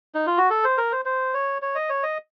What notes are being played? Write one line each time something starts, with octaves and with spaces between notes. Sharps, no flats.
D#4
F4
F#4
A4
C5
A#4
C5
C5
C#5
C#5
D#5
C#5
D#5